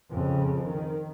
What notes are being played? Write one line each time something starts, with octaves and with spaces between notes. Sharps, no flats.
F2 C#3
D#3